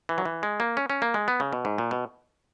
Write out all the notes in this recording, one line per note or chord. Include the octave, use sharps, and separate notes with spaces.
E3
F#3
E3
G#3
A#3
C#4
C#4
A#3
G#3
B3
C#3
B2
G#2
A#2
B2